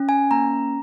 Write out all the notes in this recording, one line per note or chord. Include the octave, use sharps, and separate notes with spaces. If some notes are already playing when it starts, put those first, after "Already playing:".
Already playing: C#4
G#5
A#3 A#5